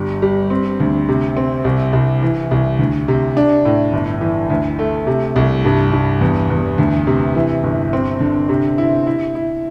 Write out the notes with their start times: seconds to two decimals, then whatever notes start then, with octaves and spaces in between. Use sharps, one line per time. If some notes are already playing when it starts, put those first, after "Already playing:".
Already playing: G1 G3
0.22 G3
0.50 C4
0.80 D2
1.09 C3
1.37 C4
1.64 C2
1.93 C2
2.22 E3
2.51 C2
2.79 D2
3.08 C3
3.37 D4
3.65 A2
3.93 G1
4.21 E3
4.50 D2
4.79 A3
5.07 C3
5.36 C2
5.65 G2
5.92 G2
6.21 E2
6.50 E2
6.78 D2
7.07 C3
7.35 E3
7.64 G1
7.93 C4
8.20 D3
8.49 C3
8.78 E4
9.07 E4
9.35 E4